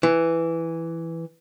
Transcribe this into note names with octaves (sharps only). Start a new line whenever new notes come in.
E3